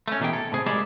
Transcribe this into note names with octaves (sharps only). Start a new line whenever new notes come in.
A3 C#4
B2 E3 A#3 G#4 G5
A4
A2 C3 G#4
G#3 A#3 E4 G4 G#4 D5